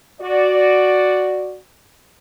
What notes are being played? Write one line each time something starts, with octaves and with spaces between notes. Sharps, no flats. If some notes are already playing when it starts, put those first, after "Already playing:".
F#4 D5